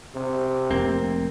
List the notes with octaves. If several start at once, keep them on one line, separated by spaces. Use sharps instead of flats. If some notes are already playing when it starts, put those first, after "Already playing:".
C3
F1 A#3 C4